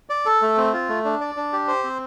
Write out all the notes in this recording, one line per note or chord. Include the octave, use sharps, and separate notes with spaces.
D5
A4
A3
C4
F4
A3
D4
D5
D4
G4
C5
C4